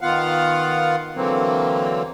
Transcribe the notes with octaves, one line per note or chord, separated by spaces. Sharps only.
D#3 B3 F4 F5 F#5
D3 E3 F#3 A#3 C4